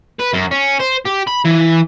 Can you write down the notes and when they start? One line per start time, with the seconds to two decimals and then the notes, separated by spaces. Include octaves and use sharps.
0.19 B4
0.33 F#2
0.51 C#4
0.80 C5
1.06 G4
1.28 B5
1.45 E3